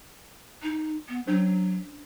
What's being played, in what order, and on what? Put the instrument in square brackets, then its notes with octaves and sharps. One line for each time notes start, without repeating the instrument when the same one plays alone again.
[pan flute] D#4
B3
[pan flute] F#3 [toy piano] C#4 D4 C5